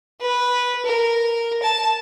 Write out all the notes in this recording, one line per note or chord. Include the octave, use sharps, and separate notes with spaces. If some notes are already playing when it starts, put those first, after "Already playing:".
B4
A#4
A5